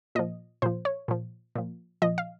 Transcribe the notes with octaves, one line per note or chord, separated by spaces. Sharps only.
A#2 F3 D#5
A#2 F3 C5
C#5
A#2 F3
A#2 F3
A#2 F3 D#5
F5